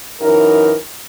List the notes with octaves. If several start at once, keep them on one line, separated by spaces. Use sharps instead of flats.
F#2 E3 D#4 A#4